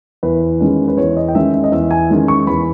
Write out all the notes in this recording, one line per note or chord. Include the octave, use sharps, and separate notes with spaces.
E2 B4
D#3 G#3 C#4
B4
E2 C#5
D#5
G5
D#3 G#3 C#4 E5
E5
D#5
E2 E5
G#5
D#3 G#3 C#4
C#6
E2 B5